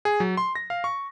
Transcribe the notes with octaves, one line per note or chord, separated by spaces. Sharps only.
G#4
F#3
C6
A#6
F5
C#6